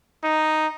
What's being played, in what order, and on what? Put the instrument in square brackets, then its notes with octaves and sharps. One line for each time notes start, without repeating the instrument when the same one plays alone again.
[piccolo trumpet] D#4